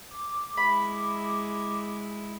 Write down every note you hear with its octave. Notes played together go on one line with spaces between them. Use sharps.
D6
G#3 E4 B5